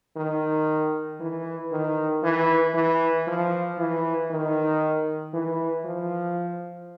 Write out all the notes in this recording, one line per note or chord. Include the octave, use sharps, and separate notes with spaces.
D#3
E3
D#3
E3
E3
F3
E3
D#3
E3
F3